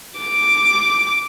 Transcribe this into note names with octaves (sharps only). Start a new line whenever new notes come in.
D6